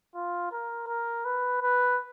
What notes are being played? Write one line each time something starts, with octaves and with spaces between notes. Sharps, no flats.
F4
A#4
A#4
B4
B4